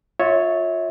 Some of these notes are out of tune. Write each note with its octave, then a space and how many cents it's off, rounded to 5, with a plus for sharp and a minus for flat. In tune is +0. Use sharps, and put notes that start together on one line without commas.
F4 +20 C#5 +0 E5 -30